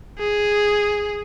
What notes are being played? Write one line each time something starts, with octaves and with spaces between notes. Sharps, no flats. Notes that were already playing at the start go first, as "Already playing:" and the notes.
G#4